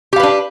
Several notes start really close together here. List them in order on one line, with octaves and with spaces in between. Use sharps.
G4 F5 B4 D4